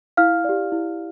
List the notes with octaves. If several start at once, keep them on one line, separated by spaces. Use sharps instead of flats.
E4 F5 F6
G4 D5
E4